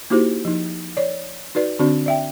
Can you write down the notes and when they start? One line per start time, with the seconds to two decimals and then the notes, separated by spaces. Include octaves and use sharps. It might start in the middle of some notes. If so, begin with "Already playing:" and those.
0.10 A#3 D#4 E4 F#4 G4 C5
0.45 F3 D#4
0.97 C#5 D5
1.55 D#4 F#4 B4 D5
1.79 D3 C4 D4 F#4 D5
2.06 D5 E5 G5